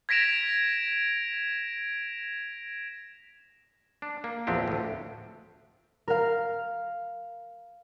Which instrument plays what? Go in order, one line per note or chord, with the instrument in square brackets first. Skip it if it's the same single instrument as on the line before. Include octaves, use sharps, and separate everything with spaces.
[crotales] G#6 A#6 B6 D7 E7 F7
[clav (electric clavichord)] D4
A#3
A#1 E2 F3 C4 D4 G4
D2 A2
[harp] A#4 F5